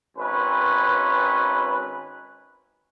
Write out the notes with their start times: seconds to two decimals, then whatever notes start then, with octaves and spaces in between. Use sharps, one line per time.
0.17 G#1 C#4 B4